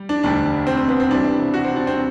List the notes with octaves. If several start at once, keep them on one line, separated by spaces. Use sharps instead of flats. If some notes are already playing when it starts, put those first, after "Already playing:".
Already playing: G3
D4
E1 D2 D3 G3 D4
C4
C4
B3
C4
C2 C3 E3 G3 D4
F#4
C4
D4
C4